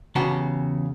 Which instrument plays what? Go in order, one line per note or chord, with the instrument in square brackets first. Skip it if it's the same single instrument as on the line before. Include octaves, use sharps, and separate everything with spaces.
[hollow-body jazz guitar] E2 C#3 B3 F#4 G4 A5